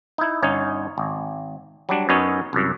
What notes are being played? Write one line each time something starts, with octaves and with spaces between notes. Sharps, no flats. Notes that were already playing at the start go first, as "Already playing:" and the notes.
D#4 E4
G1 C#4 D#4 C#5
G#1
F#3 G3 D4
F#2 B3 C#4 D#4 C#5
C2 F#2